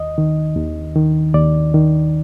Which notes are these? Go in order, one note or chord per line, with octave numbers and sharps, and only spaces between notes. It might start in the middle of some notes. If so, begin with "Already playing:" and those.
Already playing: D#2 D#5
D#3
D#2
D#3
D#2 D5
D#3